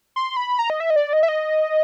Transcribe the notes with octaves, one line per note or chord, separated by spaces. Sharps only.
C6
B5
A#5
D#5
E5
D#5
D5
D#5
E5
D#5